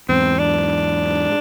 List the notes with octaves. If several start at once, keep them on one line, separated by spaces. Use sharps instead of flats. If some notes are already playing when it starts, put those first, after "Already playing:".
E2 G#2 C4
D4